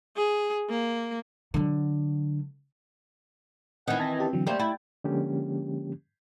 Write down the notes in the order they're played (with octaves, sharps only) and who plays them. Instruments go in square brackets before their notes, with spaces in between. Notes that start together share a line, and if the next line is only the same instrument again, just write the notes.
[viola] G#4
A#3
[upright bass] D3 F#3
[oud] D#3 E3 [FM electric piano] C4 [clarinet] F#5
[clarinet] C4 [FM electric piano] A5 G#6 A#6
[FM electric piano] C#4 G4 A5
D3 E3 F#3
[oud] G3 A#3 C4 [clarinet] A3 [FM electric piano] G5
[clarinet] A3 [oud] E4 [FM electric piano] G5 A6
[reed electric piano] D3 F3 G#3 A#3 C#4 G4